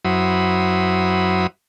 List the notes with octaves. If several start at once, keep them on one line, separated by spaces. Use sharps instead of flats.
F#2 F#3 E4 C5 B5 D#6